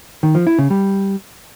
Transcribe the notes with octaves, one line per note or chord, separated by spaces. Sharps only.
D#3
F3
E4
C#3
G3